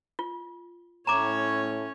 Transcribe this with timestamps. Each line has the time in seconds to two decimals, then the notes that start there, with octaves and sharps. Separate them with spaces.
0.19 F4
1.07 A2 C#4 C#5 A#5 D6